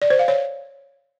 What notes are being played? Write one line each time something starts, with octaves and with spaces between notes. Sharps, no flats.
D5
C5
F5
C#5